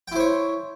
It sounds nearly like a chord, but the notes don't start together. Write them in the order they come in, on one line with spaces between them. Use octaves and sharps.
G5 E4 C5 C#5